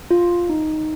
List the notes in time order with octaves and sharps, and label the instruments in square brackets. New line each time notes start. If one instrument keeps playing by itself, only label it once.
[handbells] F4
D#4